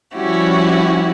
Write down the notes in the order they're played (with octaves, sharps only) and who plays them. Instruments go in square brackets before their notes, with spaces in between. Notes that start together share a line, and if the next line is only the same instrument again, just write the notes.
[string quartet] F3 G3 C#4 E4 F#4 G4